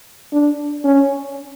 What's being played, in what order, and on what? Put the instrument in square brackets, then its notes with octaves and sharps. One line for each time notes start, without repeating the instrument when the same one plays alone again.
[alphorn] D4
C#4